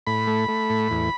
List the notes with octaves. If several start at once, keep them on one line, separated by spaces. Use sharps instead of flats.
A2 B5
A3
A3
A2
E2